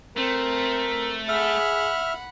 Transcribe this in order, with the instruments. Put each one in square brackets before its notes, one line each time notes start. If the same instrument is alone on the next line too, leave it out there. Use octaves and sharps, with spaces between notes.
[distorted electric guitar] A3 [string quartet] C4 [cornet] A#4
[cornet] G#4 [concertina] E5 F6 [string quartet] F#5 B5